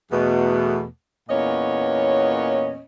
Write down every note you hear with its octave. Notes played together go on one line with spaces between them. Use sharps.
E2 B2 A3
E2 A#2 B3 C#4 C#5 D#5